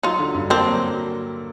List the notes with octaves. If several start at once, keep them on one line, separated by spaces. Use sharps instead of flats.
F#3 D#4 F4
D3
G2
A#3 C4 D4
F#3